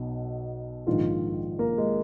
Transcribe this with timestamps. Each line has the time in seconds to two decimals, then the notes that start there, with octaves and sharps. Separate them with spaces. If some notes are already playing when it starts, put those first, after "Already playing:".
Already playing: B1 B2
0.87 A#1 G#2 D#3 F4
1.59 A#3
1.78 G#3